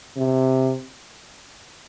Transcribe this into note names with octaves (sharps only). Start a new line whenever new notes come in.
C3